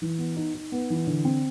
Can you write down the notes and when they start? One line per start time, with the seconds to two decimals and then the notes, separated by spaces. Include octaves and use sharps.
0.02 E3
0.18 B3
0.36 D#4
0.54 D#4
0.72 B3
0.90 E3
1.07 D3
1.25 C4